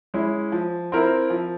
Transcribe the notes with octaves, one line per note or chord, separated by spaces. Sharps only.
G#3 C#4 E4
F3
C4 E4 A#4
F3